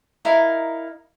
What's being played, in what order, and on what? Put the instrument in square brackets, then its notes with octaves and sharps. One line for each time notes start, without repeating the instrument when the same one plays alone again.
[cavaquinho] D#4 E4 A#4 F5